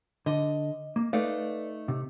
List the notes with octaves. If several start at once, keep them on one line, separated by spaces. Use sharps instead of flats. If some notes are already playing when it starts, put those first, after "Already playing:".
D3 D#5
A#3
A3 D#4 B4 D5 F5
C3